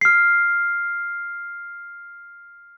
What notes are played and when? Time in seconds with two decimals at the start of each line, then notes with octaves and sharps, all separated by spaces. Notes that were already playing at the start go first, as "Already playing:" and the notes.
0.01 F6 C7